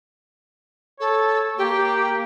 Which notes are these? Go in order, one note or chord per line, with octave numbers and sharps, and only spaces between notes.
A4 C#5
A#3 G4